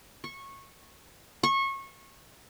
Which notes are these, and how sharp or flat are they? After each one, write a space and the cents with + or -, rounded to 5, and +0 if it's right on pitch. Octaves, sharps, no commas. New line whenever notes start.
C#6 -15
C#6 -25